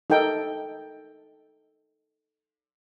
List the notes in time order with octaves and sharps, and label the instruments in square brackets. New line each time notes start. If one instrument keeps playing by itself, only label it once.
[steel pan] D#4 A4 A#4 G5